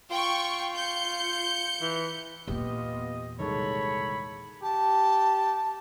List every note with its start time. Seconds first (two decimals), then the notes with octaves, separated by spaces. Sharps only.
0.10 F4 G5 C#6
0.75 G6 C#7
1.81 E3
2.48 E2 A#2 B3 F4 G4 D#5
3.40 C2 D#3 G#3 A4 C#5 B5
4.63 G4 A5